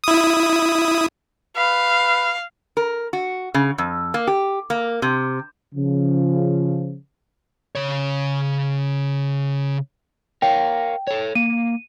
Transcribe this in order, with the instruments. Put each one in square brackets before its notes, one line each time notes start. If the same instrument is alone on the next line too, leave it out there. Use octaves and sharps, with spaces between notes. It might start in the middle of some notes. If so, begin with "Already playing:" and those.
[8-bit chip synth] E4 D#6
[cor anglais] B4 [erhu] F5
[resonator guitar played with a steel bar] A#4
F#4
C#3
F2
A#3
G4
A#3
C3
[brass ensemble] C#3 F3
[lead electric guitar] C#3 C#5
[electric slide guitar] A#4 C#5 F5 [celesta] G5
[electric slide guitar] A4 C#5
[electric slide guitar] A#3 [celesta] D#7